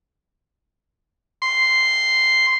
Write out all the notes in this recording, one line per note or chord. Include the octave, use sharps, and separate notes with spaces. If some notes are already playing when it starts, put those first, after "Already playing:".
C6